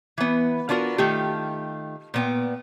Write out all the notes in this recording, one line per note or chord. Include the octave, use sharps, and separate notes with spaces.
E3 B3
B3 D4 F4 F#4 A#4
D#3 A3 F4 G4
A#2 B3 G5